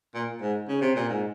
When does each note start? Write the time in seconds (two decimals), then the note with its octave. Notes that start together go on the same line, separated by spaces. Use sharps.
0.14 A#2
0.41 G#2
0.68 C#3
0.81 C3
0.96 A#2
1.09 G#2